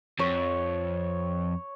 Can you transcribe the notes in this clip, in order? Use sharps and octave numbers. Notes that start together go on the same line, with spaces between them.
F2 C#5